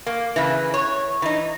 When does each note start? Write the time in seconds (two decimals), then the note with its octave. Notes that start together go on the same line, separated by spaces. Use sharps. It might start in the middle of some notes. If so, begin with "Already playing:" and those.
0.06 A#3
0.36 C#3 E3
0.74 C#5
1.22 E3 D#4